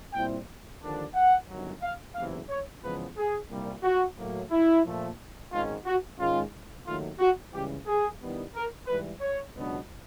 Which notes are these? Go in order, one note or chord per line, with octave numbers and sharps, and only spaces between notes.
A#2 G3 C4 E4 G5
D#2 D3 F3 A#3 D4
F#5
G1 F#2 D#3 F#3
F5
F#1 E2 C3 E3 F5
C#5
E2 C#3 F3 G#3 B3 B4
G#4
C2 A#2 G3
F#4
A2 F#3 A#3
E4
A#2 F3 A3
G#1 G#2 D#3 G#3 C#4 F4
F#4
G#2 D#3 G#3 C#4 F4
D#2 D#3 F#3 A3 F4
F#4
C#2 C#3 E3 G3 G4
G#4
G2 D#3 G3 B3 E4
A#4
G#2 E3 G3 B4
C#5
C#2 B2 F#3 B3 D4